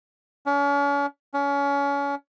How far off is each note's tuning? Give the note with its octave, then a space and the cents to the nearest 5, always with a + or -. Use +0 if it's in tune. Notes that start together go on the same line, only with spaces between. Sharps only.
C#4 +40
C#4 +30